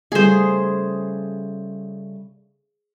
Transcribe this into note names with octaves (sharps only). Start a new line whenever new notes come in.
C#3 G3 A3 G#4 C5